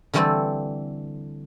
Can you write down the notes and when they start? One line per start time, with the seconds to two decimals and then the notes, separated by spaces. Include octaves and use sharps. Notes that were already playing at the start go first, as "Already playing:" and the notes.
0.13 D3 E3 G3 A3 C4 A4